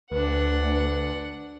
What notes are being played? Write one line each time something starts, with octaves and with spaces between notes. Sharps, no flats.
D2 D4 B4 F#5